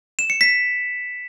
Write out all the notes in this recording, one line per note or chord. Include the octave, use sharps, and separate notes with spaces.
E7
C#7
B6